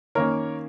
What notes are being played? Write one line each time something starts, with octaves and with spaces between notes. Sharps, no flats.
D#3 A#3 C#4 A#4 C#5